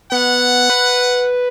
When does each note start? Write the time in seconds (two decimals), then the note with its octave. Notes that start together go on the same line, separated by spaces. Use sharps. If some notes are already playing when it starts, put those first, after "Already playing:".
0.12 B3 F#5
0.70 B4